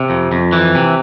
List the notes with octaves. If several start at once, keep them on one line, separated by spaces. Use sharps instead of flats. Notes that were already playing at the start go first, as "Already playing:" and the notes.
Already playing: C3
F2
F2
E3
C3